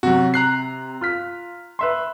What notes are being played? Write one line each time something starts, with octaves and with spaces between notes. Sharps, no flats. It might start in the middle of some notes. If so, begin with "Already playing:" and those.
C3 F#3 F#4
A#5 F#6 C7
F4 F6 B6
B4 E5 C6